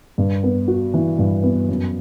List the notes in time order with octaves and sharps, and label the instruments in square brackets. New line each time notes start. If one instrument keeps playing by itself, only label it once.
[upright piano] G2
B3
F#4
E3
G2
B3
F#2